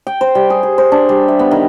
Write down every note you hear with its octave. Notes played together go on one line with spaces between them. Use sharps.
G5
C5
G3
G#4
G#4
C5
D4
G3
E5
B3
D#3